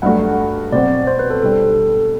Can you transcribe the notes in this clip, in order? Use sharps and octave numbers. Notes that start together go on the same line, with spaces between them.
G2 F#3 A3 D4 F#4 F#5
B2 F#3 C4 F#4 D5
C5
B4
A4
B2 G3 D4 A4